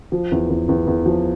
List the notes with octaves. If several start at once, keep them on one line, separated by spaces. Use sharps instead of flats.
F3
E2
E2
E2
E2
F3